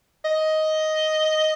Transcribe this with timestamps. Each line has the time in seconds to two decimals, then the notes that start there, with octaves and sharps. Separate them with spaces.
0.25 D#5